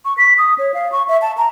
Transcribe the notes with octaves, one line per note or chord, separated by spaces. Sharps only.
C#6
B6
D#6
C#5
F5
C#6
E5
A5
A#5